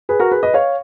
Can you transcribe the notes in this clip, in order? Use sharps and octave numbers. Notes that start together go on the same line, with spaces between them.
G#4 B4
F#4 A#4
G#4 B4
B4 D#5
C#5 F5